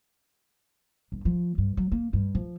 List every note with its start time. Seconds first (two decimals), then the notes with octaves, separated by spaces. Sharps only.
1.12 G1
1.25 F3
1.58 G2
1.77 F#3
1.92 A#3
2.13 G2
2.35 F3